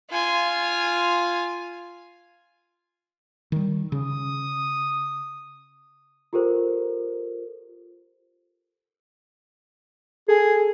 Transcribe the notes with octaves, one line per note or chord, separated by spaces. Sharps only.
F4 G#5
D#3 G3
C#3 D#6
F4 G4 A4 A#4 C5
G#4 A4 G#5